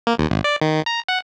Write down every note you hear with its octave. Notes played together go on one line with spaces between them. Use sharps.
A#3
D#2
G#1
D5
D#3
A#5
F#5